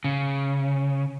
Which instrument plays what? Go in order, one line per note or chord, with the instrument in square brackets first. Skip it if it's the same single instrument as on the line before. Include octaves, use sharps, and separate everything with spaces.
[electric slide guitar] C#3